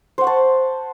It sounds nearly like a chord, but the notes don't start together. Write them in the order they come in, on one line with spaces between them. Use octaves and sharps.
C5 F#5 C#6 A5